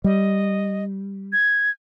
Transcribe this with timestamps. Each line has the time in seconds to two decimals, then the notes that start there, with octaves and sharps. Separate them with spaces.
0.04 G3 D#5
1.33 G#6